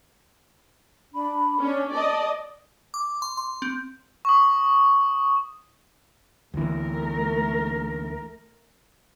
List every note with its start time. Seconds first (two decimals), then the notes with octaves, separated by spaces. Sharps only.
1.13 D4 B5
1.61 C#4 D4
1.94 D5 D#5 A5
2.94 D6
3.22 C6
3.37 C6
3.62 C4
4.25 C#6 D#6
6.54 D2 E3 A3 A#4